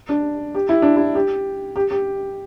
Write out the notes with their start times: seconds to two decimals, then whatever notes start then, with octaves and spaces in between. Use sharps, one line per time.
0.09 D4
0.55 G4
0.69 E4
0.82 D4
0.96 E4
1.15 G4
1.76 G4
1.91 G4